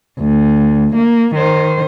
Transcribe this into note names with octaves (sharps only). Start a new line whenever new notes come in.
D2
A#3
D#3 C5